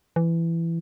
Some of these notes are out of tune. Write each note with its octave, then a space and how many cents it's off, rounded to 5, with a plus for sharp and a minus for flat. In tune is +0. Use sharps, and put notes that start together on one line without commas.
E3 +15